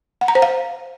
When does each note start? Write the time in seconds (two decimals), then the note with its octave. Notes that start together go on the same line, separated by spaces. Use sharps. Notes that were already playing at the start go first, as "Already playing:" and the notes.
0.21 F#5
0.28 A#5
0.35 C5
0.42 F5